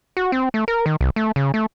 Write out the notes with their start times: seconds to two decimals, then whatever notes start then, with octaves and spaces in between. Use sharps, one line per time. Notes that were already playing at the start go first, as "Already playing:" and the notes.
0.17 F#4
0.32 C4
0.54 A3
0.68 A#4
0.86 D#3
1.01 C2
1.16 A3
1.36 C#3
1.54 A3